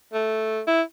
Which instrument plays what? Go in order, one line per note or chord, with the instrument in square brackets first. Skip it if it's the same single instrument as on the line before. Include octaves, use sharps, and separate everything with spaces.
[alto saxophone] A3
E4